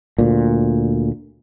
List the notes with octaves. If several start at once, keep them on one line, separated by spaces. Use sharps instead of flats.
D2 A#2